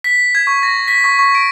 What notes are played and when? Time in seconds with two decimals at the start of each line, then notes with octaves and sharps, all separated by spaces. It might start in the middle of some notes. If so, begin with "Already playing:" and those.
0.04 B6
0.35 G#6
0.47 C#6
0.63 A#6
0.88 B6
1.04 C#6
1.19 C#6
1.35 D7